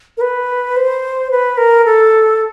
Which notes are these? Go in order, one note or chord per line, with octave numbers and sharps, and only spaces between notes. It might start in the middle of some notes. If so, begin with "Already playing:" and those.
A#4
B4
C5
B4
A#4
A4